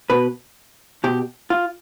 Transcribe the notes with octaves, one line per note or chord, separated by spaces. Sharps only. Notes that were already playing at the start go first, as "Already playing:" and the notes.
B2 B4
B2 G4
F4